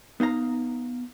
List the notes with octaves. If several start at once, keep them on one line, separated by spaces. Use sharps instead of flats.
B3 D#4 F5 A#5